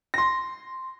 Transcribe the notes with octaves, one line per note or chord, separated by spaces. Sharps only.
C6 A#6